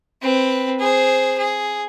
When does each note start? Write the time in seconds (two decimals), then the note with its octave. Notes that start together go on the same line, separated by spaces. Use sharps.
0.22 C4 B4
0.80 G#4 C5
1.38 G#4